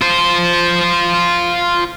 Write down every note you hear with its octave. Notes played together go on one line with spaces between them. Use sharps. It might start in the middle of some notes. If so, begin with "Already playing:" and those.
F4 C5